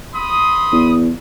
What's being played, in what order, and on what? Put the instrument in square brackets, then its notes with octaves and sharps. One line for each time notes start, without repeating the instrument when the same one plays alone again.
[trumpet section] B5 C6 D#6
[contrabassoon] E2